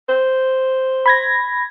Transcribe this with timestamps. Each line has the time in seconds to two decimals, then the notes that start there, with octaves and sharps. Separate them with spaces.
0.09 C5
1.06 B5 G#6 A#6